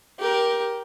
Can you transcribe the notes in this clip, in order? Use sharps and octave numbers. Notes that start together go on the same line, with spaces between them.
G4 A#4